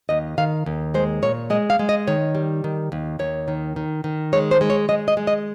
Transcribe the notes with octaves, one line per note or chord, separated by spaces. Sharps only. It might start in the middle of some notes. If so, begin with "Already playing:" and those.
D#2 D#5
D#3 F5
D#2
G#3 C5
A#2 C#5
G#3 D#5
F5
G#3
D#5
D#3 C#5
G3
D#3
D#2
D#2 C#5
D#3
D#3
D#3
G#3 C#5
C5
G#3
C#5
G#3 D#5
D#5
G#3
D#5